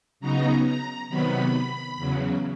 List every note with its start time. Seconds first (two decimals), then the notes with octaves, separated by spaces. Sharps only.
0.20 C#3 F#3 B3 D#4 A#5
0.65 A#5
1.09 C3 D#3 F#3 B3 B5
1.97 E2 C#3 F#3